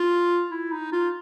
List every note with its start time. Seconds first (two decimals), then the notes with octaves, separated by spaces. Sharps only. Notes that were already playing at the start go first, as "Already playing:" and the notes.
Already playing: F4
0.51 E4
0.72 D#4
0.92 F4